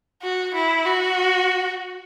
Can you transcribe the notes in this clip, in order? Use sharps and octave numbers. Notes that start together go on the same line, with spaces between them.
F#4
E4
F#4